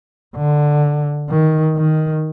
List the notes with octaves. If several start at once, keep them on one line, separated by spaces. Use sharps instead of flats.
D3
D#3
D#3